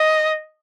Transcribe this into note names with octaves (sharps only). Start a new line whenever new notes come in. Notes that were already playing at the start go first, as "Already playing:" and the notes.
Already playing: D#5